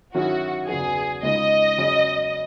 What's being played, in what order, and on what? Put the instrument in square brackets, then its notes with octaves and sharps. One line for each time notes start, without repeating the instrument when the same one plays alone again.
[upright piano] D#3 F#3 C#4 E4 G#4 [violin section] F#4
[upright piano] E2 C#3 F#3 B3 [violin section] G#4
[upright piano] C#2 C#3 G#3 D#4 G#4 [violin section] D#5
[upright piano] E2 C#3 F#3 C#4 G#4